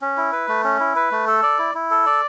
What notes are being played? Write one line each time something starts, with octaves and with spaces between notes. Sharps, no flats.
C#4
E4
B4
A3
C#4
E4
B4
A3
A4
D5
E4
E4
A4
D5